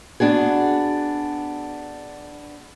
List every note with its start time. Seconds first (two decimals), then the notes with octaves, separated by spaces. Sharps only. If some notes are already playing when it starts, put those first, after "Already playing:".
0.20 B3 D4 F#4 G#4